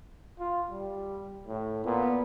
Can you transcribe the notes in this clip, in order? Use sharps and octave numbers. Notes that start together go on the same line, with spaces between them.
F4
G3
A2
A#2 B3